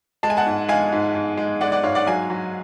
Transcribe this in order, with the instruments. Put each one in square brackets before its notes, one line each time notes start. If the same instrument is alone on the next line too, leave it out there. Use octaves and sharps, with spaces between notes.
[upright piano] G#3 A5
G#5
F#5 A5
G#2
G#3 F5 G#5
G#2
G#2
G#3
G#3 D5 F#5
D5 F#5
G#2 C#5 F5
D5 F#5
F#3 F5 G#5
F#3